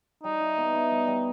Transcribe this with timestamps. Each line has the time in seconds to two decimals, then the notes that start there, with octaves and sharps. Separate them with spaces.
0.23 G3 D#4
0.40 E4
0.58 B3
0.74 E4
0.91 G3
1.07 G3